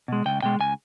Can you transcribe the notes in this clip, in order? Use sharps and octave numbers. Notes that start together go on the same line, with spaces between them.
B2 G#3
C#2 G5
B2 G#3 G5
C#2 G#5